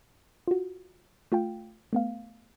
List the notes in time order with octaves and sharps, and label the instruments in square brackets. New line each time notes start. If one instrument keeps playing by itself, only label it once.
[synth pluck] F4 F#4
A3 F4 F5 G5
A3 B3 F5